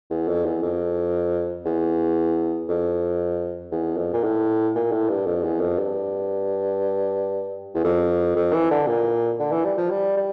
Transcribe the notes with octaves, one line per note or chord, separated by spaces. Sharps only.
E2
F2
E2
F2
E2
F2
E2
F2
A#2
A2
A#2
A2
G2
F2
E2
F2
G2
E2
F2
F2
E3
D3
A#2
D3
E3
G3
F3
G3
G3